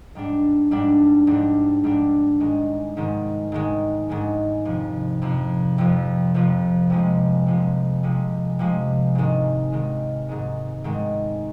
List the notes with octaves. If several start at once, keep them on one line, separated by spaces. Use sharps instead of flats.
G#2 G3 D4
G#2 G3 D4
G#2 G3 D4
G#2 G3 D4
G#2 D#3 G#3
G#2 D#3 G#3
G#2 D#3 G#3
G#2 D#3 G#3
F2 C3 F3
F2 C3 F3
F2 C3 F3
F2 C3 F3
C3 F3 G#3
C3 F3 G#3
C3 F3 G#3
C3 F3 G#3
G#2 D#3 G#3
G#2 D#3 G#3
G#2 D#3 G#3
G#2 D#3 G#3